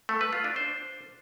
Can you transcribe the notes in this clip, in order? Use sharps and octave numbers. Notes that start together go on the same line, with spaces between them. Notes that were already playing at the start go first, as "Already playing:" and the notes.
A3
B4
F4
D4
C5